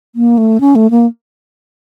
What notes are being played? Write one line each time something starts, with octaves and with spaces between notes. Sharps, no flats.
A#3
A3
C#4
A3
A#3